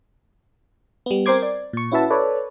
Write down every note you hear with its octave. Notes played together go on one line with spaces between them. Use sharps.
G3 B3
C4 A#4 C5 C6 D6 G#6
D5
A#2 C#6
C#4 E4 F#4 B4 E5 A5
A4 B4 C#5 D5